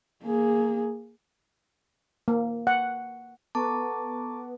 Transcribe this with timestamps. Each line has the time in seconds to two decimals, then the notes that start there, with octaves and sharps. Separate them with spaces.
0.24 A#3 G#4
2.28 A#3
2.67 F#5
3.55 B3 A4 A5 A#5 C#6 D6